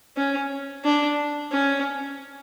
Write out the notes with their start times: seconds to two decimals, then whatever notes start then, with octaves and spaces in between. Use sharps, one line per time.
0.17 C#4
0.84 D4
1.51 C#4